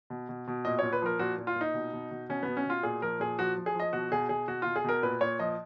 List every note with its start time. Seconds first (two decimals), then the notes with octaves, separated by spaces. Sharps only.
0.10 B2
0.29 B2
0.47 B2
0.65 A#2 D#5
0.79 A#2 C#5
0.93 B4
1.02 F3 A#4
1.19 A#2 F#4
1.38 A#2
1.47 F4
1.56 A#2
1.61 D#4
1.74 B2
1.93 B2
2.11 B2
2.29 B2 C#4
2.43 B2 B3
2.57 C#4
2.66 B2 F4
2.83 A#2 G#4
3.02 F3 A#4
3.20 A#2 G#4
3.39 F3 F#4
3.57 F3
3.66 G#4
3.75 F3 D#5
3.93 B2 F#4
4.12 B2 G#4
4.29 B2 G#4
4.48 B2 F#4
4.62 B2 F4
4.76 G#4
4.84 B2 A#4
5.03 A#2 B4
5.21 A#2 C#5
5.39 F3 D#5